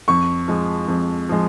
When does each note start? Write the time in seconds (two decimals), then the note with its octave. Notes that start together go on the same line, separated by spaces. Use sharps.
0.08 F2 C#6
0.48 F3 G#3
0.88 F2
1.29 F3 G#3